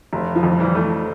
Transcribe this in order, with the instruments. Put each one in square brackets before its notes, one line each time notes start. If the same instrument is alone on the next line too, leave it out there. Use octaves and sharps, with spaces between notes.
[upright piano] F1
[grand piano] F3
[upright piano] F2
[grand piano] E3 G3
[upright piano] A3